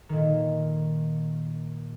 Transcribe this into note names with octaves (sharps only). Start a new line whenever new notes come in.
A#2 D#3